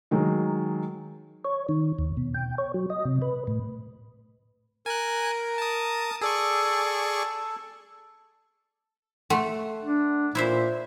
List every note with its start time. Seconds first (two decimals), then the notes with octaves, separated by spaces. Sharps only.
0.11 D#3 F#3 G#3 D#4
1.45 C#5
1.69 D#3
1.99 D#2
2.17 B2
2.34 G5
2.58 C#5
2.74 F#3
2.90 D#5
3.05 C3
3.22 B4
3.47 A2
4.86 A#4 G#5 F#6
5.58 A5 D#6
6.21 G#4 A4 D5 C#6
9.30 A3 A4 F#5 C6
9.83 D4
10.35 A#2 E4 C5 E5